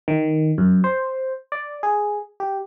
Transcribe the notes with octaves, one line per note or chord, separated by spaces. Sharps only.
D#3
F#2
C5
D5
G#4
G4